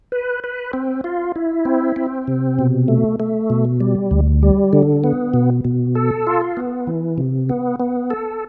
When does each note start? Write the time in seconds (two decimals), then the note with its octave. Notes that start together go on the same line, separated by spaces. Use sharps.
0.12 B4
0.44 B4
0.73 C4
1.04 F4
1.36 E4
1.65 C4
1.96 C4
2.28 C3
2.59 B2
2.88 A3
3.20 A3
3.50 B2
3.80 G3
4.11 D2
4.43 G3
4.73 D3
5.04 B3
5.34 B2
5.64 B2
5.95 A4
6.27 F4
6.57 B3
6.87 E3
7.18 C3
7.50 B3
7.80 B3
8.10 A4